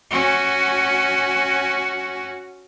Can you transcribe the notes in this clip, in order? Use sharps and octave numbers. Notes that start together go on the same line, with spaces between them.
C#4 F#4